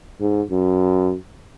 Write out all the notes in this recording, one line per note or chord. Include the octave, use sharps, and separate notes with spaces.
G#2
F#2